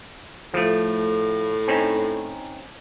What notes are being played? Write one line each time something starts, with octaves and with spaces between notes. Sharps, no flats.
A2 F3 A3
C4 C#4 D#4